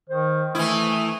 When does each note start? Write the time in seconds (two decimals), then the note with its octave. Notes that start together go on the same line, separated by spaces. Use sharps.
0.10 D#3 C5
0.55 E3 A3 E4 D#6